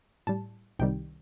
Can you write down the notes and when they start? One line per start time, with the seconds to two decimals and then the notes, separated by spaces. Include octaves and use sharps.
0.27 A2 G3 A5
0.79 C2 C3 D#3 G3 G5